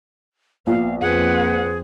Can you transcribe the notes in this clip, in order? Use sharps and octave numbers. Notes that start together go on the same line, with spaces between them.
A#1 B3 F5
F2 C4 G#4 B4 F#5